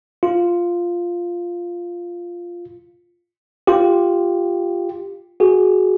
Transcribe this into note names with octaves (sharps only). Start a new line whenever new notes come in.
F4
F4 G4
F#4 G#4